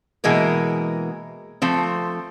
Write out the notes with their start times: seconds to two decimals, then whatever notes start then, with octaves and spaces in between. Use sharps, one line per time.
0.24 B2 E3 G#3 A#3 A#4
1.62 F3 A3 C4